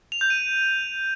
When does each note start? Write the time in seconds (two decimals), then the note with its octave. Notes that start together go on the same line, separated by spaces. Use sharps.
0.12 F7
0.21 G6
0.30 D#7